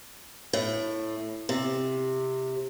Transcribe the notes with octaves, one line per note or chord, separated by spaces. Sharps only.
A2
C3